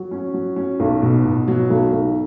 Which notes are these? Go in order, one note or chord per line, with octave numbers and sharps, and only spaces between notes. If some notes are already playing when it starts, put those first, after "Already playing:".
Already playing: F#3
C#4
F#3
C#4
B1
B2
B2
F#3
B1
B1